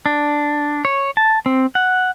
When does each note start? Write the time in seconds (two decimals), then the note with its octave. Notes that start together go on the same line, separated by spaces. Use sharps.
0.06 D4
0.85 C#5
1.17 A5
1.46 C4
1.75 F#5